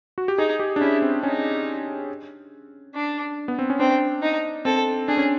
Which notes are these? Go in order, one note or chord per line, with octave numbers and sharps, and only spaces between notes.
F#4
G4
D#4 G#4
G4
D4
C#4 E4
C4
C#4 D#4
D4
B3
C4
C#4
C4 D4
D#4
C4 A4
D4 G#4
C#4